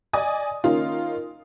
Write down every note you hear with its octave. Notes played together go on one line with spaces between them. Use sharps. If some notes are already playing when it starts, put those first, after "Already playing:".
D5 D#5 G#5 D#6
D#3 A#3 C#4 D#4 F4